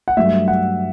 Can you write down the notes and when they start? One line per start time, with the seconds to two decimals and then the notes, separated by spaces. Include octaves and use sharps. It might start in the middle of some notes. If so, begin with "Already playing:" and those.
0.08 F#5
0.17 G2 F#3 A3 E5
0.48 F#5